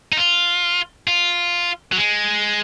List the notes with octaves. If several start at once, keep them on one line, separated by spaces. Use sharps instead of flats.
D#4
F4
F4
F#3
G#3